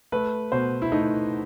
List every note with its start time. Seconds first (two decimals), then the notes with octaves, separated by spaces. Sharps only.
0.12 A3 B4
0.52 B2 C5
0.82 E4
0.92 A3 D#4